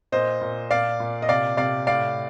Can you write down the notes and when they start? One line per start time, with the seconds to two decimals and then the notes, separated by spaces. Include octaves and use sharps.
0.12 A#2 C5 D#5
0.41 A#2
0.70 A#2 D5 F5
1.00 A#2
1.22 D#5
1.29 C3 D5 F5
1.57 C3 D5 F5
1.87 A2 D5 F5